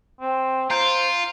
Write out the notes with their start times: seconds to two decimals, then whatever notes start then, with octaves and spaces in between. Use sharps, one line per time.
0.21 C4
0.70 F4 C5 A#5 G6 D7